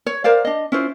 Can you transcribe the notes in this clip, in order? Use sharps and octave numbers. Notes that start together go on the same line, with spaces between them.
C#5
A#4 C5 D5 F5
D4 D#5
C#4 E4 F4 C5